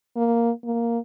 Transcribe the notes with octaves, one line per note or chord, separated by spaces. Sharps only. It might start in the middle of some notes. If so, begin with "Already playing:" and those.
A#3
A#3